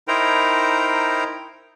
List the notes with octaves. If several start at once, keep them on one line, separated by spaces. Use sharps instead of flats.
D#4 E4 A#4 C5 G5 A#5